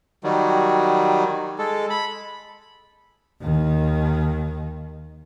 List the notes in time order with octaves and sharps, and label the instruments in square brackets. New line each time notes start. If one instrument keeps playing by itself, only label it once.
[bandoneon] D#3 F#3 G3
G#3 A4
B5
[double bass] D#2 D#3